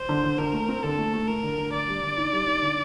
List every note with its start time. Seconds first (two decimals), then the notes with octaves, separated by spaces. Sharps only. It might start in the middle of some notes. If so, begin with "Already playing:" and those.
Already playing: C5
0.09 D3
0.23 D3
0.38 D3 A#4
0.53 A3
0.69 C4
0.83 D3 A4
0.98 A3
1.13 A3
1.27 A3 A#4
1.43 D3
1.58 D3
1.73 D3 D5
1.88 G3
2.03 D3
2.17 D#4
2.33 G3
2.47 D#4
2.62 D3